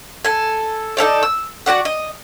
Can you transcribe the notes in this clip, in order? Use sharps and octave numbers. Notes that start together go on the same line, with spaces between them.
A4 G#5
D#4 A4 C#5 D5
E6
F#4 A#4 D5 F#5
D#5